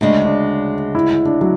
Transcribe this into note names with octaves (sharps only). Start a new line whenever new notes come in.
D2 C#3 G#3 D4
D4
E4
E4
D4
F#3